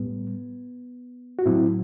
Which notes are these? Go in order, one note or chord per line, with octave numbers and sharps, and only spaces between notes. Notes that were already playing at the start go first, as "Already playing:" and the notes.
Already playing: A2 G3 B3
F#4
A2 F#3 C4 E4